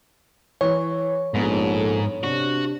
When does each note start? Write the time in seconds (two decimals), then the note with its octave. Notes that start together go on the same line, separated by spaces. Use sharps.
0.61 E3 C#5
1.34 A#1 G#2 B3 A4
2.24 C3 D4 F#4